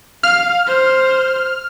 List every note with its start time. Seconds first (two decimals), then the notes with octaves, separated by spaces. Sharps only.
0.23 F5 F6
0.67 C5